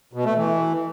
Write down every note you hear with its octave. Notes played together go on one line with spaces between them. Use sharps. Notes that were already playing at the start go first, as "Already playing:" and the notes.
B2
A3
E3